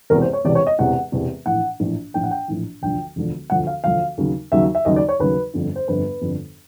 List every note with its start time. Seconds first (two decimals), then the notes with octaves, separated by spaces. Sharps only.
0.10 E1 E2 C3 A#4
0.21 C5
0.33 C#5
0.44 E1 E2 C3 D5
0.55 C#5
0.67 D#5
0.79 E1 E2 C3 F#5
1.12 E1 E2 C3
1.46 A#1 A2 E3 F#5
1.80 A#1 A2 E3
2.14 A#1 A2 E3 G5
2.24 F#5
2.31 G5
2.48 A#1 A2 E3
2.82 E1 D2 D3 F3 G5
3.16 E1 D2 D3 F3
3.50 E1 D2 D3 F3 F#5
3.67 F5
3.84 E1 D2 D3 F3 F5
4.17 D#2 C#3 F#3
4.52 D#2 C#3 F#3 E5
4.75 E5
4.85 D#2 C#3 F#3 D#5
4.96 D5
5.09 C#5
5.19 D#2 C#3 F#3 B4
5.54 G1 F2 D3
5.76 C5
5.88 G1 F2 D3 B4
6.21 G1 F2 D3